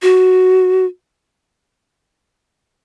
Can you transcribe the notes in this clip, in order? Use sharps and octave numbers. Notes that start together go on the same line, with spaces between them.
F#4